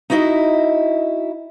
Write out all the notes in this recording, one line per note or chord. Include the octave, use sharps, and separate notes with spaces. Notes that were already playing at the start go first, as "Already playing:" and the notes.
D#4 E4 F#4 D#5 E5